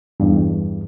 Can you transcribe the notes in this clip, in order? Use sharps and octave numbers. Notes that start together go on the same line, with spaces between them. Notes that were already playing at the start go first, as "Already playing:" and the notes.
E2 G2